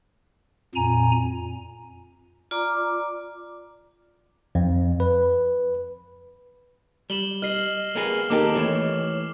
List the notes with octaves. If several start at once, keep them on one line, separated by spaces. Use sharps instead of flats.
F2 A#2 G#5 A#5
F4 D5 A#5 D6
F2
B4
G3 E7 F#7 G7
D#5 F6 C7
A#3 B3 G#4
D#2 A#3 D#4 G4 A4 D6
E3 A3 C#5